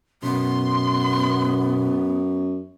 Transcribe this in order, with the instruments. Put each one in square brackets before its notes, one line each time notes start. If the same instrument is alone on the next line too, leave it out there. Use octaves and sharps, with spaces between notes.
[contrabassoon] F#2 [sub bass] B2 [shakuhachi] B3 [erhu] C6